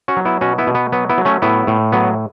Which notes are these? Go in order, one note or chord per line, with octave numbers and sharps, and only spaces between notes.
C#4 F#4
F#3
B3 E4
B2 C#4 F#4
B3 E4
B2
B3
F#3 B3
B3 E4
F#3
A3 C#4
A2 B3 E4
A2
F#3 B3